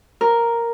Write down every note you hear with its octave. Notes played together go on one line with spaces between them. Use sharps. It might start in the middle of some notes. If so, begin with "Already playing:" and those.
A#4